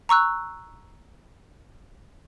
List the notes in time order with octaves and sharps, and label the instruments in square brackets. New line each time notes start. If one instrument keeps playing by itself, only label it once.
[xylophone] A#5 C#6 E6 F#6